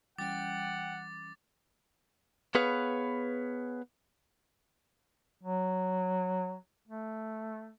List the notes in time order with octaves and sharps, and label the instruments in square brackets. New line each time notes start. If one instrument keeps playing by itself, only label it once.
[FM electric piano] E3 G3 C#4 [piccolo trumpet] F#5 [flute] G5 [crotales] D6 A6
[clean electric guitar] B3 G#4 B4 C#5 F5
[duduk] F#3
A3